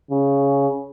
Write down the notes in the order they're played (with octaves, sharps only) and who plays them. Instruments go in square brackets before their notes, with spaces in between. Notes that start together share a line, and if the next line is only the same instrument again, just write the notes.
[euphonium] C#3